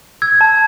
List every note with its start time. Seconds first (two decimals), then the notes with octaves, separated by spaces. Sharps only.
0.22 E6 G#6
0.41 A5